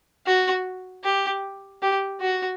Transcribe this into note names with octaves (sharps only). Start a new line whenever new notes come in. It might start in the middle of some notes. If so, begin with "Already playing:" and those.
F#4
G4
G4
F#4